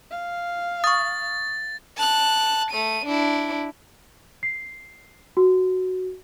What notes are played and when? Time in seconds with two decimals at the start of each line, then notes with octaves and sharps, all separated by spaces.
0.11 F5
0.84 C#6 D#6 A6
1.97 A5 F#6
2.71 A3 D#7
3.06 D4 E4
4.43 C7
5.37 F#4